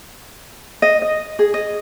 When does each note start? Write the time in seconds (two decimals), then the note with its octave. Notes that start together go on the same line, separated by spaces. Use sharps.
0.82 D#5
1.02 D#5
1.39 G#4
1.54 D#5